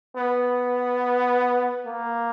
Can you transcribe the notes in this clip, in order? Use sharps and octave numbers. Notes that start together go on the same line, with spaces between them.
B3
A#3